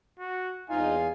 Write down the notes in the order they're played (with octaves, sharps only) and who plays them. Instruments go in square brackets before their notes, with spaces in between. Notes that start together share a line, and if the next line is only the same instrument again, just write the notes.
[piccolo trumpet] F#4
[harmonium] E2 F5 G#5 [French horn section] G#3 C4 D#4 [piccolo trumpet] F4